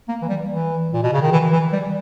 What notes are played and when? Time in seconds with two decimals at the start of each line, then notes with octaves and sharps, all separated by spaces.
0.08 A#3
0.22 E3
0.29 G3
0.50 E3
0.93 A#2
1.03 B2
1.13 C#3
1.22 D#3
1.32 E3
1.52 E3
1.73 G3